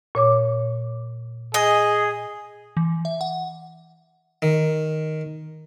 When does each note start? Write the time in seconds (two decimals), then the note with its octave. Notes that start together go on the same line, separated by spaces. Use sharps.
0.15 A#2 C#5 D6
1.54 G#4 D#5
2.77 E3
3.05 E5
3.21 F#5
4.42 D#3